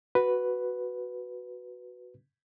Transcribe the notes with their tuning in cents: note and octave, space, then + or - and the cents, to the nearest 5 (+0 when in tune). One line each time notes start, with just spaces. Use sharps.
F#4 +0 B4 +0